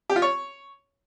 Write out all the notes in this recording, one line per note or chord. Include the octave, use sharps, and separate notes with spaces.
G4
F4
C#5